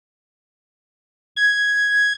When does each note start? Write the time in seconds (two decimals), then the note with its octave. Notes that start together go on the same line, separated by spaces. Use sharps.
1.36 G#6